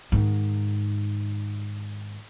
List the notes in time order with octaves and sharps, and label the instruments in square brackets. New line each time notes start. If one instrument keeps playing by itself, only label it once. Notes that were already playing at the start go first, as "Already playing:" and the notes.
[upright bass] G#2 D#3